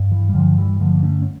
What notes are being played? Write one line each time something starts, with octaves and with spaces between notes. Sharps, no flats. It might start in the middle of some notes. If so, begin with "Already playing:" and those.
Already playing: G2
E3
G3
G2 D3 F3
E3 G3
D3 F3 A3
A#3
A3 C#4
C#4